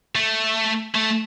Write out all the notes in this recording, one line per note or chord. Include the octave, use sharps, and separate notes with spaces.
A3
A3